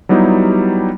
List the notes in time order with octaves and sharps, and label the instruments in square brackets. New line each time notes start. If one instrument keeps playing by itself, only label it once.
[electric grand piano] F#3 G3 B3 D#4 E4 G4